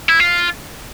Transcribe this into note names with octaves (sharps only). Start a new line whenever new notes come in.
E4
F4